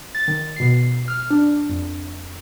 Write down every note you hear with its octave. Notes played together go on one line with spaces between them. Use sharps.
A6
D#3
B2 C7
F6
D4
F2